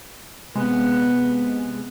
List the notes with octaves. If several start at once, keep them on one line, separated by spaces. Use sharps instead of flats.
C3 G#3 B3